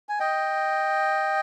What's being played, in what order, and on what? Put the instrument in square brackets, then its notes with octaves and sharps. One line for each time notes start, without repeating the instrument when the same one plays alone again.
[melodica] G#5
D#5 G5